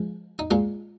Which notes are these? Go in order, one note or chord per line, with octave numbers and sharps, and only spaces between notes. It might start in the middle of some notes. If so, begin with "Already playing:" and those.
Already playing: F3 G#3
D#4
A#2 G#3 F4